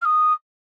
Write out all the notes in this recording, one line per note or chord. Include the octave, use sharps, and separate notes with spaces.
F6
D#6